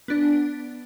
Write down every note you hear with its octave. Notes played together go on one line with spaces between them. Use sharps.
B3 D4